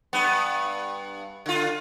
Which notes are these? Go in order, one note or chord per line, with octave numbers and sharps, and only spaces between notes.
G2 B3
D3 F4